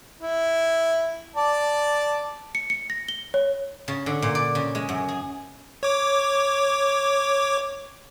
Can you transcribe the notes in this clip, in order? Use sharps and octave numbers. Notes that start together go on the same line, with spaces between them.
E4
D5 A5
C#7
C#7
A#6
G7
C#5
C#3
D3
A#2
D5
C#3
G#3
F#2
G#4
C#5 D6